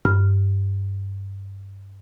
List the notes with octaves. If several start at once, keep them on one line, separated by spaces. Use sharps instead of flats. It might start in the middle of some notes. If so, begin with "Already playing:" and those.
G2 F6